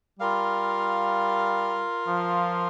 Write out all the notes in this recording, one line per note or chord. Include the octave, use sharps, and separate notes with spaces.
G3 F4 A#4 F5
F3